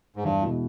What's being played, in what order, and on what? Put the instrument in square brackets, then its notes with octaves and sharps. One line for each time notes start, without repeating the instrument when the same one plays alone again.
[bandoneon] G#2
[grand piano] E2 [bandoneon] G2
[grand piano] B2 G#3 B3 E4